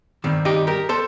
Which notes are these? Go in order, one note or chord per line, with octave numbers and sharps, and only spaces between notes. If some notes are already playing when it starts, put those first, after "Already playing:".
G2 D#3 G3 C4
D#4 G4
G4 A#4
A4 C5